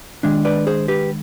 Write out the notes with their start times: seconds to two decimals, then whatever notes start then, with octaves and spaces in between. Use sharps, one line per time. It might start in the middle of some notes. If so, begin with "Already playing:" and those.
0.23 D#3 G#3 D4
0.45 B4 D5
0.67 G#4 C5
0.88 G4 B4